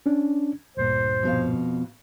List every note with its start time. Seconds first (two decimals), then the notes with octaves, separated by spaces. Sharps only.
0.06 C#4 D4
0.77 D2 G2 A#2 C5
1.23 F2 B2 F5